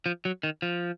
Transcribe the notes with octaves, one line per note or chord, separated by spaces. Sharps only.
F3
F#3
D#3
F3